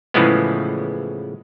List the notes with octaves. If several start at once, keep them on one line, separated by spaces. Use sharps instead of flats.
A2 C#3 E3 F3 G#3 B3